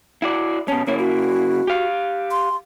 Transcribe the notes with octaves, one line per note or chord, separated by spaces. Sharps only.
E4 F#4 D5
B2 C#4 A5
C#3 A#3 E4 C#5
F#4
G4 F5
C6